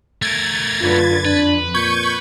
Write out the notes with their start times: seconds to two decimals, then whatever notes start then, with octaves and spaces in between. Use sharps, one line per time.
0.22 A3 A#4 G#6 A6
0.81 F#2 D3 F4 B4
1.25 F2 D4 B4
1.74 A#2 C#6 G6 G#6